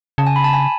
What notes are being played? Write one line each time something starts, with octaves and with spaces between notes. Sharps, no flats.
C#3 A5
G#5
B5
A5
G#5